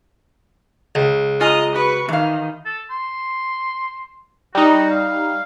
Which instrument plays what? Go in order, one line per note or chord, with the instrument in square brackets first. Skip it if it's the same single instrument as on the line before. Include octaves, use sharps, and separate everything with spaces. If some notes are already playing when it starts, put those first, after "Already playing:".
[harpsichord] C#2
[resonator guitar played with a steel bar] F4 G#5 A#5 [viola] D#5
[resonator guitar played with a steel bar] F#4 [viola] B4 C#6
[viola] D#3 [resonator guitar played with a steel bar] E3 F5
[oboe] A4
C6
[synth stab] G3 D#4 [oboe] F#4
[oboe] F5